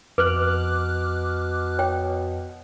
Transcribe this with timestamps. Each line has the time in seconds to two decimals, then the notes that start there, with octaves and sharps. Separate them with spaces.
0.18 F2 B2 B4 D6 F6 F#6
1.79 C#5 G5